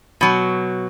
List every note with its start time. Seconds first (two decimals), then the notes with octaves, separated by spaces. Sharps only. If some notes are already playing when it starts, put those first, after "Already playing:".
0.21 B2 F#3